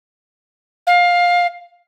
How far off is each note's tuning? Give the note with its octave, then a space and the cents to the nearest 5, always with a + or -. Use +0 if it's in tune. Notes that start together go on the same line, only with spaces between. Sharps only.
F5 +15